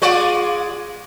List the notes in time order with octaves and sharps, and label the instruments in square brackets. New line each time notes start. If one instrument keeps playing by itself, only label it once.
[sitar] G#3 F4 D5